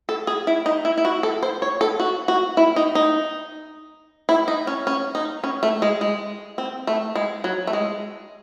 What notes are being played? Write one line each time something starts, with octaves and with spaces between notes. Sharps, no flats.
A4
G#4
E4
D#4
E4
E4
F#4
A4
C5
C#5
A4
F#4
F#4
E4
D#4
D#4
E4
D#4
C#4
C#4
D#4
C#4
A3
G#3
G#3
C4
A3
G#3
F#3
A3
G#3